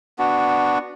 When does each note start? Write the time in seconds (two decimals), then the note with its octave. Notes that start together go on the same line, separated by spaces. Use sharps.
0.18 B3 D4 F#4